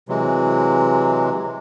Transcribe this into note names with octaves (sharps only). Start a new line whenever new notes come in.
C3 E3 F#3 G#3